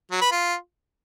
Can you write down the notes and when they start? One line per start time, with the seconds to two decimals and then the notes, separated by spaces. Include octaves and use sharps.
0.11 F#3
0.21 B4
0.31 F4